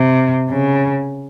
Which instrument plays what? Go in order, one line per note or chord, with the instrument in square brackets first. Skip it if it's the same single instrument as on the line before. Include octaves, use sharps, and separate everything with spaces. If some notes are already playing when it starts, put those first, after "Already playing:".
Already playing: [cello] C3
C#3